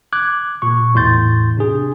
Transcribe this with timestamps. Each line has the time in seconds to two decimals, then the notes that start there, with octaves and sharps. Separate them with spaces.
0.13 D6 F#6 G#6
0.62 A#2 C#6
0.94 E2 A2 C6 G6 A6
1.57 C3 D4 G#4